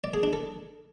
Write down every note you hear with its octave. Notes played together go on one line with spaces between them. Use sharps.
D5
G#4
D4
A4